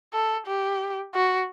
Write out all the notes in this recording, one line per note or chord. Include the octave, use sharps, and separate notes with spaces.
A4
G4
F#4